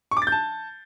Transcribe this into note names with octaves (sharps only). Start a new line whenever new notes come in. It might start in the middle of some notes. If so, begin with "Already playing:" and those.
C#6
D6
A6
G6
A5